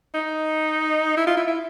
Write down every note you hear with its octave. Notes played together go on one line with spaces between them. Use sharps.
D#4
E4
F4
E4
E4